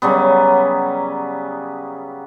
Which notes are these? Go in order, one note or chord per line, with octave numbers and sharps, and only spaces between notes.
C#3 F#3 G3 B3